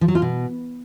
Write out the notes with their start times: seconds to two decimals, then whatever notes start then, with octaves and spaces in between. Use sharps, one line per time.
0.01 F3
0.08 F#3
0.15 F4
0.22 B2